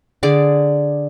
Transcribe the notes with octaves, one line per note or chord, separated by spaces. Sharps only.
D3 G#4 D5 D6